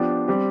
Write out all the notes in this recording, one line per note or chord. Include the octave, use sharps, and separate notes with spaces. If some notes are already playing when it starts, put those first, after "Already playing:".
Already playing: F3 B3 D4 G4
G3 C4 G4